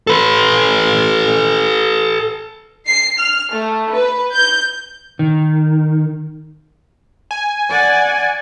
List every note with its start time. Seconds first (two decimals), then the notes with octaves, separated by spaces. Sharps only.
0.07 A4 B4
2.86 C7
3.18 F6
3.51 A3
3.91 B4
4.33 G6
5.19 D#3
7.31 G#5
7.70 D5 F#5